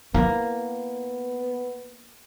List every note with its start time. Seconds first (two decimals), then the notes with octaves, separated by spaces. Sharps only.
0.14 A#3 B3 E4